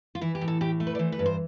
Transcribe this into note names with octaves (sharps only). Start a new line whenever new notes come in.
F4
E3 E4
G4
A2
A4
A2 G4
A3
B4
D5
E3 C5
B4
G2
C5